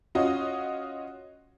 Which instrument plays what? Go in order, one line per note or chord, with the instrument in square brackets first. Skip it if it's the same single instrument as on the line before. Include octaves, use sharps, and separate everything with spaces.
[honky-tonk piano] C#4 F4 F#4 D#5